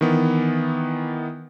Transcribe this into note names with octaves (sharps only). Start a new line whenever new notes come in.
D#3 E3 B3